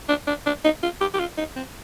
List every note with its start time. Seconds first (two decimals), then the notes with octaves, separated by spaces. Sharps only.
0.09 D4
0.27 D4
0.46 D4
0.64 D#4
0.82 F4
1.00 G4
1.14 G4
1.19 F4
1.37 D#4
1.56 C4